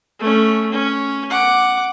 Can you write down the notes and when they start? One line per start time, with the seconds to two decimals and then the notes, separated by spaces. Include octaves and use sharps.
0.19 A3 C#4
0.71 C#4
1.30 F#5 D6